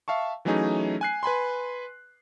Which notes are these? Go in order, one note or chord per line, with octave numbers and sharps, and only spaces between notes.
E5 F5 A5 C#6
E3 F#3 A3 C#4 D#4 G#4
G#5 F#6 C7
B4 G#5 B5 C6